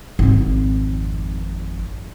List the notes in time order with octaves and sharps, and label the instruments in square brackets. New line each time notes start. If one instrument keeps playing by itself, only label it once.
[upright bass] G#1 F2